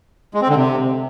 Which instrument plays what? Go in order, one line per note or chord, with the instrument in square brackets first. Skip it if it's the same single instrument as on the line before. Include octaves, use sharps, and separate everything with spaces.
[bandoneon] G#3
C4
D3
C3